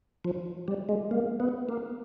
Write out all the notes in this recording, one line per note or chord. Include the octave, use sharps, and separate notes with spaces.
F3
G3
G#3
A#3
B3
A#3